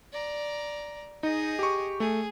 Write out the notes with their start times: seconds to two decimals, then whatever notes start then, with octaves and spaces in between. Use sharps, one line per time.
0.13 D5 A#5
1.23 D#4 G#4 D#5
1.59 G4 C#6
2.00 A3 G#4